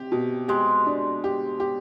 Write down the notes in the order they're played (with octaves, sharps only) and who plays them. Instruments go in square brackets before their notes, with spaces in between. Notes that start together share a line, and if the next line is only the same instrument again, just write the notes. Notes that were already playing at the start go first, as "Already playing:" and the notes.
Already playing: [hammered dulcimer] C3 [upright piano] G4
[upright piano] B2
[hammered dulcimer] G#3 [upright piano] G4
[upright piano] D4
G4
G4